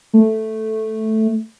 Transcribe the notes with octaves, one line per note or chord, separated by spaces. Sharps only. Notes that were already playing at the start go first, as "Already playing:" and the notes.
A3